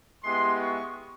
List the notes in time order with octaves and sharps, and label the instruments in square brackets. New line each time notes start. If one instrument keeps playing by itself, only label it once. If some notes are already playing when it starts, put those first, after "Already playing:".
[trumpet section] G#3 B3 E4 G4 C6
C#6